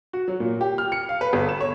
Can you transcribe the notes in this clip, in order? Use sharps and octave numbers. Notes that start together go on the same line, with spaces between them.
F#4
F#3
A#2
G4
F6
C#7
F5
B4
G1
E7
C#5